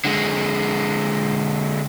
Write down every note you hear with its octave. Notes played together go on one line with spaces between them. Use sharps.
D3 G#3